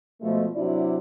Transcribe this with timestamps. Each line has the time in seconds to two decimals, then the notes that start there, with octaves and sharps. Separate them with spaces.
0.21 B2 F3 G#3 A3
0.55 C3 F#3 D4 E4 F#4 D5